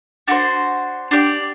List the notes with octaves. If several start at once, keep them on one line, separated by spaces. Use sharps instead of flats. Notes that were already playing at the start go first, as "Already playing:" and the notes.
D4 F#4 A4 C5
D4 G4 D5